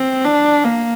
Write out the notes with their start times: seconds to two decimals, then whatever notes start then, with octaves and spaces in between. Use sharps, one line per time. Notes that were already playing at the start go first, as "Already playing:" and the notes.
Already playing: C4
0.24 D4
0.64 A#3